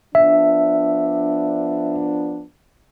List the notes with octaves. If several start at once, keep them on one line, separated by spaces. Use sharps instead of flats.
F3 B3 D4 E5